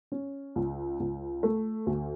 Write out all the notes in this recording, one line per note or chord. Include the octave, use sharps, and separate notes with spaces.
C#4
C#2
C#2
A3
D2